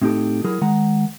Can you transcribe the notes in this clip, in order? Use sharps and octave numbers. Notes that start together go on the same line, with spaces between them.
A2 C4 D#4 F#4 G4 A4
F#3 E4 G#4 A#4
D#3 G#3 F#5 A#5